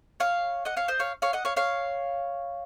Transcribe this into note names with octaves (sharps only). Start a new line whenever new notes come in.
C#5 F5
D#5 F#5
C#5 F5
C5 D#5
C#5 F5
C#5 F5
D#5 F#5
C#5 F5
C#5 F5